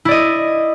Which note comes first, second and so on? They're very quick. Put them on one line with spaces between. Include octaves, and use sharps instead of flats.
E4 D5 D#5